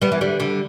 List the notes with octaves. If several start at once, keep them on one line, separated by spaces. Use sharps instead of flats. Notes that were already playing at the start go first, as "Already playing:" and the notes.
G3 B3
E3
D3 G3
D3 G3